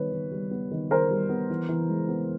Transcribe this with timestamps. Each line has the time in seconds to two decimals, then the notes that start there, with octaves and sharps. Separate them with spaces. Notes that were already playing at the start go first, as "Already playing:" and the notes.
Already playing: D#3 G3 B3 B4 C#5
0.12 D#3
0.32 G3
0.51 B3
0.71 D#3
0.91 D#3 A#4 C5
1.11 G3
1.29 B3
1.50 E3
1.69 E3
1.89 G#3
2.09 B3